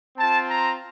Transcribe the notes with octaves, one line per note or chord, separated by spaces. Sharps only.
C4 F4 A5
A#5